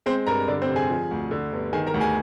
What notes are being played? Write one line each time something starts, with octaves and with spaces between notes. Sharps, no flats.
G#3 C4 C5
G2 A#4 A#5
D3 D4 D5
C4 C5
F1
G#4 G#5
F3
D2
D3
G1
D#3 G#4 G#5
A#4 A#5
D2
G#4 G#5